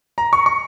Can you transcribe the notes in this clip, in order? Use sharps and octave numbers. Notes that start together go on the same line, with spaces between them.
A#5
C#6
C#6